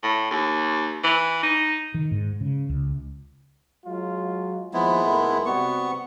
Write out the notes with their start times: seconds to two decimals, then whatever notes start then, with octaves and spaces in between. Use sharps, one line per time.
0.03 A2
0.31 D#2
1.03 E3
1.43 D#4
1.94 D#3
2.11 G#2
2.41 C#3
2.69 C#2
3.85 F#3 G#3 F4
4.74 D#2 F3 G#3 B3 E4
5.04 G#1 A3 A#4
5.46 C3 G3 B3 F#4 C#6